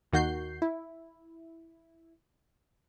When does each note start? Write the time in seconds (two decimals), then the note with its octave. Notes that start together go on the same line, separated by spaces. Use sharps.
0.12 D#2 D#3 F#4 G6 C7
0.62 E4